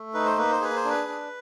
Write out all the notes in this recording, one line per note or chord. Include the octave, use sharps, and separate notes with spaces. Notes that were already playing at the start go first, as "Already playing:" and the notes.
Already playing: A3
D#4 B4
C5
A#3 B4
C5
G#4 B4
C5
D4 B4
D4